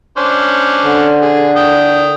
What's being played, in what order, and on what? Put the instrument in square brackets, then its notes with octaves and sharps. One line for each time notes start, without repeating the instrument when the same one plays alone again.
[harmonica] C#4 D4 C5
[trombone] D3
[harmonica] G#4
G5 D#6